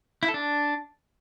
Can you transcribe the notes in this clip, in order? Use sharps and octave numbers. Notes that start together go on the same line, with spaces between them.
E4
A4
D4